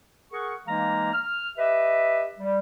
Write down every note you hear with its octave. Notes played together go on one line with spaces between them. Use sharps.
G#4 A#4 F#5 C#6
E3 G#3 A#3 D#4 F5 A#5
F6
G4 B4 D#5 E5
G3